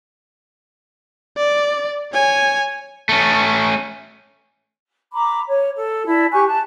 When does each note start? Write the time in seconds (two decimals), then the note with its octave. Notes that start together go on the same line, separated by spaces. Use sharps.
1.37 D5
2.13 C#5 G#5
3.09 A3 C#4
5.12 A#5 B5 D6
5.47 C#5
5.75 A4
6.07 E4 D5 A5
6.31 G4 G#5 C#6 F#6
6.46 A5 F#6